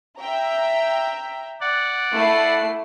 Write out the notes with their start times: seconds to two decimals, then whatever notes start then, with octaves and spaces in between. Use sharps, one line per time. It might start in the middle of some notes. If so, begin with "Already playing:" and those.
0.19 E5 G5 A#5
1.61 D5 F#5
2.12 A3 E4 C7